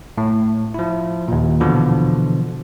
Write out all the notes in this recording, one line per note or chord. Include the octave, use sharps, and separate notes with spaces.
A2
F3 E4
D#2 A#2
B2 D3 E3 F3